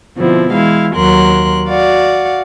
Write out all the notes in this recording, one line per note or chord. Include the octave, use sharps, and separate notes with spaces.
B2 D3 F3 C4 E4
E3 G#3 E4 F5
D#2 F#3 A#4 C6 F#6
F#4 D5 F5 F#5